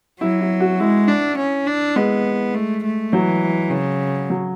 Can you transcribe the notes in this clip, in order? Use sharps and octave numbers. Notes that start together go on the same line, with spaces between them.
F#3 E4
E4
F#4
G#3 E4
D4
C#4
D4
G#3 B3
A3
A3
E3 F#3
C#3
F#3